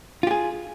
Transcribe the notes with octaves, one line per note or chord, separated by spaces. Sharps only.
F4 G4 G#4